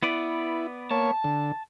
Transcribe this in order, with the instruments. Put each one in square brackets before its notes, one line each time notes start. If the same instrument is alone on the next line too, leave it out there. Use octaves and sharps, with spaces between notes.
[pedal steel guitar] B3 B4 D5 [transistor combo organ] E4
[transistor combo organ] A#3 C#5 [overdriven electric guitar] A5
[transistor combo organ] D3